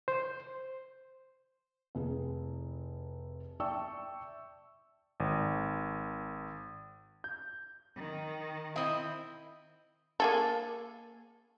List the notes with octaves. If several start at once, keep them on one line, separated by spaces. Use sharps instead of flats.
C5
F1 E4 G#4
D5 E5 G5 A5 C#6 E6
G#1
G6
D#3
C4 E4 D#5
A#3 G#4 A4